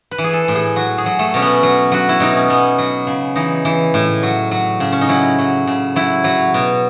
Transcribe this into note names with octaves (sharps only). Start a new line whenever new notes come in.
B4
E3
G#4
A4
A2
G#4
F#3 F#4
G#4
F#3
A3
B2 C#4
B3
F#3
F#3 F#4
E4
B2 D#4
C#4
F#3 B3
F#3
C#3
E3 D#4
E3
A2
F#3
F#3
C#3
C#4
D#4
F#3 E4
F#3
C#3
F#3 E4
F#3
B2